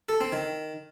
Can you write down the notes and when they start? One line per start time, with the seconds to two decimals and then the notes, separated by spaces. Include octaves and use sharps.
0.09 A4
0.21 C4
0.33 D#3